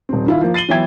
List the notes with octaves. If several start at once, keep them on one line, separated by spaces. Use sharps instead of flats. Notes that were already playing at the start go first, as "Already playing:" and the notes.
D#1 C4
D#3 E4 F4
F3 A#3
A6 C7 D#7 F#7 G7
E3 F#3 B3 E5 G5 G#6